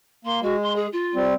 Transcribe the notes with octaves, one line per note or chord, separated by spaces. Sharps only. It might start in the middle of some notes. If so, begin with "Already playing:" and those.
A#3 C6
G#3 F#4
C6
G#4
F4
G3 C4